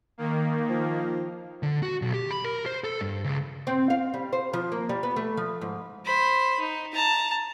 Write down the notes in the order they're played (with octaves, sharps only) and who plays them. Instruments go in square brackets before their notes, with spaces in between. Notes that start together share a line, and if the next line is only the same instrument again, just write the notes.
[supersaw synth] D#3 A#3
[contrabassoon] F3
[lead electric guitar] D3
F#4
B1
G4
B5
A#4
C5
A4
G2
C#2
[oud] C4
F5
G3
C5
F3
A#3
G3
B3
A3
F3
G#2
[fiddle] C5 B5
D#4
A5 A#5